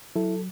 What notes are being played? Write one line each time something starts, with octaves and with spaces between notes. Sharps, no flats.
F#3 E4 A4